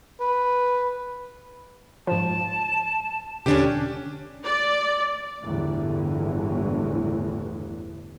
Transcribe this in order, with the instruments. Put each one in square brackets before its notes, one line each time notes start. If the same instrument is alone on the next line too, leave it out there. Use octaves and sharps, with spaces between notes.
[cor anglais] B4
[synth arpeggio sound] G#2 F3 [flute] A5
[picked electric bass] E1 D3 [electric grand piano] C#4 D4 G4
[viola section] D5
[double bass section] G1 E2 A2 D3 E3